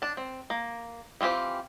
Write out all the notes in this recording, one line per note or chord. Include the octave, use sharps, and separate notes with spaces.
D4 A5
C4
A#3
E3 C4 F4 G4 C5